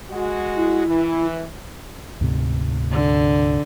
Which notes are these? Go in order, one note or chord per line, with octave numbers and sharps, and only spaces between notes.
G#3 F#4
E4
E3
D2 G#2 C3
D3